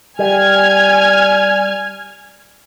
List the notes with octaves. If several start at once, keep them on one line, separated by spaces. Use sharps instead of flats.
G3 G#5 F6 G#6